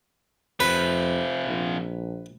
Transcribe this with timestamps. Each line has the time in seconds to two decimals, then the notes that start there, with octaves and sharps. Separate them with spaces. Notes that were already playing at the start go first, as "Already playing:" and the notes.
0.60 F2 C3 F3 B4
1.46 A#1